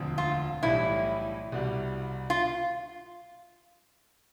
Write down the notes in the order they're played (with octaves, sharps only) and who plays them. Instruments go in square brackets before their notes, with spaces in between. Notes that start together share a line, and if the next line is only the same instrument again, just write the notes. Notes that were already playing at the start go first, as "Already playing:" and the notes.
Already playing: [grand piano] E1 D2 D3 F3 C4
[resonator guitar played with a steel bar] F4
[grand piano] B1 A2 E3 G3 [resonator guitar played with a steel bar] E4
[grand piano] C2 B2 G3
[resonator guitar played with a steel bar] F4